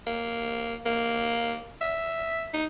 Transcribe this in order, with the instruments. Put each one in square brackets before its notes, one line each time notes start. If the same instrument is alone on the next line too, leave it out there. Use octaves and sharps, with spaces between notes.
[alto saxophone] A#3
A#3
E5
D#4